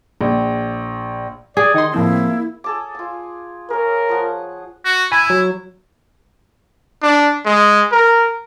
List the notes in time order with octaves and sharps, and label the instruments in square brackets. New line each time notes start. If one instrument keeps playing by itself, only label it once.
[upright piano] A#1
[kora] G#4 [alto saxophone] D5
[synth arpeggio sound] D#3 C6 [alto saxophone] D#4
[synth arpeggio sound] A2 F3 C4 [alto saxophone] A#3 [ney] E4
[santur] G#4 A4 D6
F4 G#5
[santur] G#4 C#5 [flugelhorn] A#4
[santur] F3 F#5
[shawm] F#4
[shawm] E4 [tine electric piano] G#5 B5
[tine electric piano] F#3
[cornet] D4
G#3
A#4